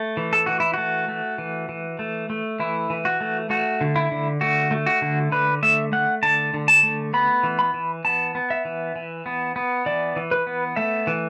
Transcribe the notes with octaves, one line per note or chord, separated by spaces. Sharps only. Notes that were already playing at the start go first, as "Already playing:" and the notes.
Already playing: A3
E3
A4
E3 F#4
E4
A3 F#4
A3
E3
E3
A3
A3
E3 E4
E3
F#4
A3
A3 F#4
D3
E4
D3
A3 F#4
A3
F#4
D3
D3 B4
A3 E5
A3 F#5
D3 A5
D3
A5
A3
B3 B5
E3
B5
E3
B3 A5
B3
E5
E3
E3
B3
B3
E3 D5
E3
B4
B3
A3 E5
E3